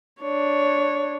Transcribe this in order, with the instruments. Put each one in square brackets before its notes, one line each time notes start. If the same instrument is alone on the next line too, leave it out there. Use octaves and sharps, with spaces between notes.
[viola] D4 C#5